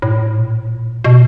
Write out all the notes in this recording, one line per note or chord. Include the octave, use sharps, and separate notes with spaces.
A2
A#2
B2